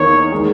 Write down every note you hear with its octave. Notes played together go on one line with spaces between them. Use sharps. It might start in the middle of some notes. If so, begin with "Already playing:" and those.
Already playing: E2 D#3 A#3 D#4 C#5
D#3 G#3